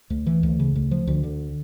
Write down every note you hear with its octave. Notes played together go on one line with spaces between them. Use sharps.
D2
E3
D2
C#3
D2
F3
D2
D3